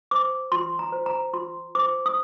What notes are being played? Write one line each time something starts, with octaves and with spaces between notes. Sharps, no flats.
C5 D6
F4 C6
A#5
C5
A#5
F4 C6
C5 D6
D#6